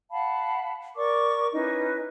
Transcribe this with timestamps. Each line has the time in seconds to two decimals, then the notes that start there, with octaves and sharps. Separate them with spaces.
0.11 F5 F#5 A5 B5
0.96 A#4 D5 C#6 D6
1.53 C#4 D#4 E4 B4